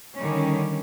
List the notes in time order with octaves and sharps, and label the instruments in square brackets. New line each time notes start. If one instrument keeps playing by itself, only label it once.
[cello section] D3 D#3 G3 C#4